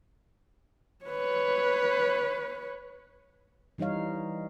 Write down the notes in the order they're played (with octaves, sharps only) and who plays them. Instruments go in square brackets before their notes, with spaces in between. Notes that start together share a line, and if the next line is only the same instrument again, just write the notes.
[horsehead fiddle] B4 C#5
[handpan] E3 G3 D#4 C#5 F5